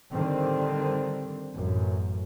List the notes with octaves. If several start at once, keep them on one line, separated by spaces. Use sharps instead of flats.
D3 D#3 G3 C4
A1 F#2 A2